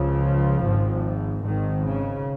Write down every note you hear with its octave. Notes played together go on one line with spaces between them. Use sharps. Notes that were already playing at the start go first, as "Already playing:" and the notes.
Already playing: C#2 C#3 F3
G#1 G#2
G#1 G#2 D#3
C#3